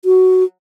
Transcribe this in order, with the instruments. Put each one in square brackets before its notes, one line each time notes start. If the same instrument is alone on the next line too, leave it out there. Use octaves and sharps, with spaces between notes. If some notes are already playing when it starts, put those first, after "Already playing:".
[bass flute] F#4